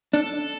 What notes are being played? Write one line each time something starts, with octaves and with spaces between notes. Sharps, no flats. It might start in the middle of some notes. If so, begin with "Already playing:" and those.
D4 A4